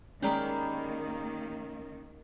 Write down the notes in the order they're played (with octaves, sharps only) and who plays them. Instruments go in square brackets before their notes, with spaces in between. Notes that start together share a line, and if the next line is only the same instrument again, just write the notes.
[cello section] D#3 A#3 [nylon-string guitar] G#3 D5 [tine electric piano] C#4 [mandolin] G4 A#4 B5